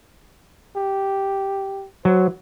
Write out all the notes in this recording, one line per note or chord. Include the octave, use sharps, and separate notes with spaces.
G4
F#3 C5